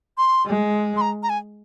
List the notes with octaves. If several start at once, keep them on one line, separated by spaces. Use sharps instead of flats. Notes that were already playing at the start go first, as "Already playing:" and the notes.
C6
G#3
C6
A#5
A#5
G#5